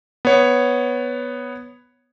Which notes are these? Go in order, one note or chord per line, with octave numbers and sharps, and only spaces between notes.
B3 C#5